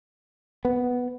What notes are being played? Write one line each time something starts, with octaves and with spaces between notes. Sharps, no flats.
B3